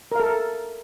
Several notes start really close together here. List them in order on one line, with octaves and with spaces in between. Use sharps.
A#4 F5 A4